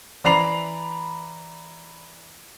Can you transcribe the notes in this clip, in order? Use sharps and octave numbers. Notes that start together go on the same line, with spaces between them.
E3 D5 A#5 B5 C7 F7